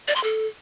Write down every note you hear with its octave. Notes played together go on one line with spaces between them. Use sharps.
D5
C6
A4